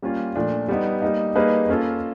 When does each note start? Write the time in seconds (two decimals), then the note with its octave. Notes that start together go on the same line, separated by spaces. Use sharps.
0.02 G3 A#3 C#4 F4
0.36 A#2 F3 A3 D4
0.68 G3 B3 D#4
1.02 G3 A#3 D#4
1.35 G3 A#3 D#4 G#4 B4
1.69 A#3 C#4 F4 A4